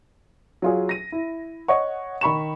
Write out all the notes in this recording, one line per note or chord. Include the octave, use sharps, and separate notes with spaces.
F#3 F4 G#4
A#6 D#7
E4
C#5 D#5 F#5 C#6
D#3 B5 C#6 E7